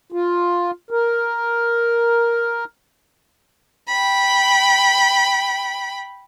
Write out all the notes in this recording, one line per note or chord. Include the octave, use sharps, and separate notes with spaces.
F4
A#4
G5 B5